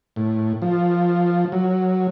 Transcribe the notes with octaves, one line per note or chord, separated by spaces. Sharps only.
A2
F3
F#3